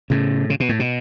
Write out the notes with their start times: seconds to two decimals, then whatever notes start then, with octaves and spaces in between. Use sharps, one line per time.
0.10 A2 C#3
0.50 C#3
0.60 B2
0.69 A2
0.79 B2